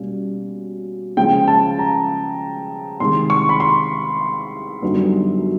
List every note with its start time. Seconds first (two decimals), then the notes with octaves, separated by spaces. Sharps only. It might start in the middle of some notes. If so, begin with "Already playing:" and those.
Already playing: B2 G3 A#3 C#4
1.17 C#3 F3 G#3 C#4 G5
1.48 A5
1.79 A#5
3.00 C3 D#3 G#3 C6
3.30 C#6
3.49 B5
3.60 C6
4.82 F#2 D3 G3 B3 D#4